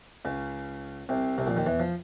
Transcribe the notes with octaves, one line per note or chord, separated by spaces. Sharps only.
C#2 C#3
C2 C3
C2 C3
A#1 A#2
D#2 D#3
E2 E3
F3